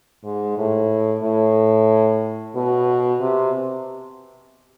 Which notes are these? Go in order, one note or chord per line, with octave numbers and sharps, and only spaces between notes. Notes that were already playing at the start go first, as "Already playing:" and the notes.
G#2
A2
A2
B2
C3